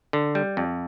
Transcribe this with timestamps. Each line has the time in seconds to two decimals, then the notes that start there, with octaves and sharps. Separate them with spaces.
0.13 D3
0.35 G3
0.57 F2